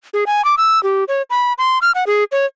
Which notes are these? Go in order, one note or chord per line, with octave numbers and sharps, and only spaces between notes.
G#4
G#5
D6
E6
G4
C#5
B5
C6
F6
F#5
G#4
C#5